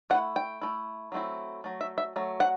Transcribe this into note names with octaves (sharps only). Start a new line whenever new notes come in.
A3 E4 F#5
G5
A3 E4
F#3 A3 C4 E4
F#3 A3
E5
E5
F#3 A3
F#5